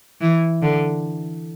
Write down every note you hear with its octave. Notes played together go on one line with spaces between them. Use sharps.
E3
D3